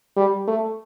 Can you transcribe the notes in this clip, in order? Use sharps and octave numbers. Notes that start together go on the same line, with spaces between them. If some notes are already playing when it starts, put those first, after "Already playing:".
G3
A3